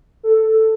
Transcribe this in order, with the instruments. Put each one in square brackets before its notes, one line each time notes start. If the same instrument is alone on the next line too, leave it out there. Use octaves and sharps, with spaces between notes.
[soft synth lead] A4